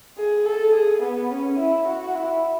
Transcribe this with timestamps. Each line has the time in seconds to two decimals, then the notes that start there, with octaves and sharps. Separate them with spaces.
0.17 G#4
0.45 A4
0.74 G#4
1.02 B3
1.30 C#4
1.59 E4
1.87 F#4
2.15 E4